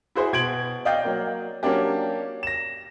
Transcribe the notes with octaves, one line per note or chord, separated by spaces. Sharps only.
E4 F#4 G#4 C5 E5
B2 G#6 D7 F#7
D5 D#5 F5 G5 G6
F#3 A#3
F#3 A#3 C#4 D4 G4
A#6 E7